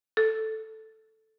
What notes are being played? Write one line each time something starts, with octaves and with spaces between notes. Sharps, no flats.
A4